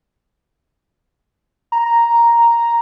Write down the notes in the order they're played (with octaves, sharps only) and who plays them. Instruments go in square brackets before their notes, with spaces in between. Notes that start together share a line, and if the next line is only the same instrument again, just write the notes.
[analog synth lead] A#5